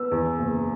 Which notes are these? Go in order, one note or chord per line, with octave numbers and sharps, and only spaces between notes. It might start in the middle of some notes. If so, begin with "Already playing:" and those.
Already playing: B3 E6
E2
F#1